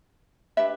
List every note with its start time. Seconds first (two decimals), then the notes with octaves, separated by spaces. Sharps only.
0.57 D4 G4 B4 E5